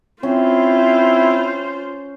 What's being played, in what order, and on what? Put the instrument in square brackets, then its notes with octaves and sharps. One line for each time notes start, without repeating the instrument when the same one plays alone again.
[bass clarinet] C4 [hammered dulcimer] C#4 [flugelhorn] E4 [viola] F4 C5